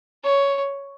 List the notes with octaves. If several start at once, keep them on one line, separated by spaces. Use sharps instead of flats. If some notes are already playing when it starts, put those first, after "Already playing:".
C#5